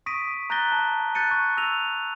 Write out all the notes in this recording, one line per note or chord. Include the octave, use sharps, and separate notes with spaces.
C#6 D#6 A#6 B6 D7 D#7
A#5 F#6 G6 A6 A#6 G7
A5
F#6 G6 A6 C#7 D#7
C#6
E6 A#6 D#7 F7